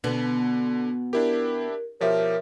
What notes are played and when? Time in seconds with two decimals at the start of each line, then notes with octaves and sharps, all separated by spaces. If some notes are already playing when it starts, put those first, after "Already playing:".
0.04 B2 D3 B3
1.13 D4 E4 G4 A#4
2.01 B2 F3 G4 A#4 C#5 E5